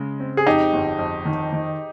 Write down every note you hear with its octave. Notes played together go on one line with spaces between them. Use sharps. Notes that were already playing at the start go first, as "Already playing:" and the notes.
Already playing: C#3 G#3
C4
G#4
F2 D#4 G4
G1
F2
D#3
D#3